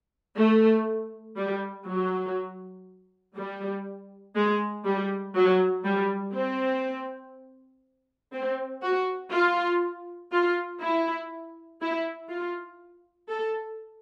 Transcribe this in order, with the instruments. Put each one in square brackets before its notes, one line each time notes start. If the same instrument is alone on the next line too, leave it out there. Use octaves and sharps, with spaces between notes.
[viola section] A3
G3
F#3
G3
G#3
G3
F#3
G3
C4
C4
F#4
F4
F4
E4
E4
F4
A4